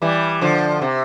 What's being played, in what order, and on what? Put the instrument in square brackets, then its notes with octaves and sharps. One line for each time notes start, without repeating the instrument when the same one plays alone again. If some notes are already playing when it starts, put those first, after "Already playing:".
[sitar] E3 G3
D3 F3
C3